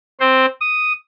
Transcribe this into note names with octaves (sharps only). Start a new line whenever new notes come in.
C4 C5
D#6